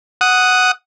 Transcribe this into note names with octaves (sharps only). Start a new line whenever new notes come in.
F#5 D#6